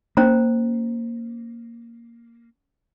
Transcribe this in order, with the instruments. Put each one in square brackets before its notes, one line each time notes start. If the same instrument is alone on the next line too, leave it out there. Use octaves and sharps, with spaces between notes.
[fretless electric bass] A#3 [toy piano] C#4 C5 A#5